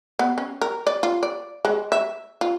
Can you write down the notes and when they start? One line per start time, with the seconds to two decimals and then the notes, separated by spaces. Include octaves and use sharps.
0.19 B3
0.38 C#4
0.62 A#4
0.87 D5
1.03 F4
1.23 D5
1.65 G#3
1.92 E5
2.41 F4